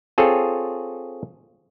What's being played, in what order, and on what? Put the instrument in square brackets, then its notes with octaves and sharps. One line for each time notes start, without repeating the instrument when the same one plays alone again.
[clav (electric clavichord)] C4 F4 G#4 A4 C#5